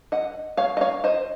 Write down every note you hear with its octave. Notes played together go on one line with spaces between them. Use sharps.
D#5 F#5
C#5 F5
D#5
C#5 F5
C5 D#5